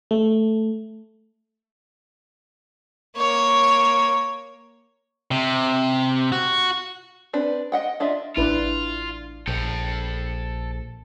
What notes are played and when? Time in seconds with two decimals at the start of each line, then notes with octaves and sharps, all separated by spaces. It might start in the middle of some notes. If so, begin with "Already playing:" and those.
0.11 A3
3.17 A#3 C#5
5.31 C3
6.32 F#4
7.33 C4 D4 B4
7.72 D#5 F#5 G5
8.00 D4 F4 D#5 E5
8.37 A1 D4 E4 F4 B4
9.47 A#1 A4 G5